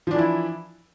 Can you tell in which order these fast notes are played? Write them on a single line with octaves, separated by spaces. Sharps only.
F3 D4 E3 E4